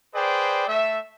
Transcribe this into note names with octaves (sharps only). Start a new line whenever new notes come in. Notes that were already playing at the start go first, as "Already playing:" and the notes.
G#4 B4 C5 D5 G5
A3 E5